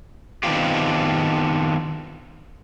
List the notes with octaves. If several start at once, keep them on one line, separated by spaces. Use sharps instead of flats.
D#3 B3 C4 D4 F4 G4